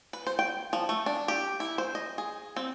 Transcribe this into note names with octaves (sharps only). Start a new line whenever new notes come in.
B4
C5
G5
F3
A3
D4
G4
E4
C5
D#5
G#4
C4